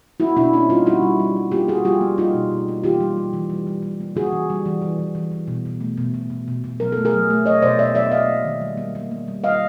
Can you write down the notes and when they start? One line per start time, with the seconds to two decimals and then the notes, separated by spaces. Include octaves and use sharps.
0.20 A#3 E4 F#4
0.36 B2 D4 E4
0.53 A#3 C#4 D#4
0.69 G3 D#4 F4
0.86 G3 E4 F#4
1.02 G3
1.20 G3
1.36 G3
1.52 A#3 F4 G4
1.68 G3 F#4 G#4
1.85 G3 F4 G4
2.01 A#3
2.18 G3 D#4 F4
2.34 B2
2.51 B2
2.68 A#3
2.84 E3 F4 G4
3.00 G3
3.17 G3
3.33 E3
3.50 G3
3.67 G3
3.83 G3
4.00 A#3
4.16 C#3 F#4 G#4
4.32 E3
4.50 G3
4.66 E3
4.82 E3
4.99 E3
5.15 E3
5.31 E3
5.48 B2
5.65 B2
5.81 A3
5.97 B2
6.14 B2
6.30 B2
6.48 B2
6.64 B2
6.80 F#3 A#4
6.92 A3 A4
7.05 G#4 A#4
7.14 F#3
7.30 A3
7.46 A3 C#5 D#5
7.62 B2 C5 D5
7.79 B2 D5 E5
7.95 F#3 D5 E5
8.12 A#3 D#5 F5
8.28 A#3
8.45 D#3
8.61 G3
8.78 A#3
8.95 A#3
9.11 A#3
9.28 G3
9.44 D#3 D#5 F5